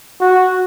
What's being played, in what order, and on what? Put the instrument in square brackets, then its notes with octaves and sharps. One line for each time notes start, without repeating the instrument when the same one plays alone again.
[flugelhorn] F#4